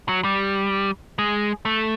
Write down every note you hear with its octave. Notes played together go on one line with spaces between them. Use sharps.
F#3
G3
G#3
A3